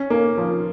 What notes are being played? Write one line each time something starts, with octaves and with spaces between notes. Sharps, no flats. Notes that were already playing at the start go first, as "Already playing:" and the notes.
Already playing: C#4
A#3
F3